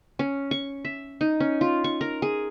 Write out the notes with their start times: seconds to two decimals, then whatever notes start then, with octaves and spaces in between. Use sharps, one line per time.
0.19 C#4
0.51 C#6
0.85 E5
1.21 D#4
1.40 C#4
1.61 F4
1.84 C#6
2.01 A#4
2.22 G#4